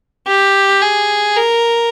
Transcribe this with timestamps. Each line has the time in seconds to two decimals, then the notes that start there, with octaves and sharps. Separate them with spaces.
0.27 G4
0.82 G#4
1.37 A#4